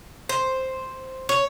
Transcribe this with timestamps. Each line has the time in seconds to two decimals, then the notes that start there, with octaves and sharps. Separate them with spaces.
0.29 C5
1.29 C#5